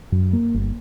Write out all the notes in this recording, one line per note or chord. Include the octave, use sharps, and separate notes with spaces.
F#2
A#3
G1